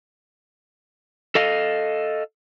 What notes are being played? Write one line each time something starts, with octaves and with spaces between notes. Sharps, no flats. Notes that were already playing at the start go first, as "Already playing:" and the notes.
A4 D#5 F5